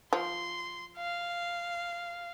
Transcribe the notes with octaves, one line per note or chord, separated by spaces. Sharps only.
F3 C6
F5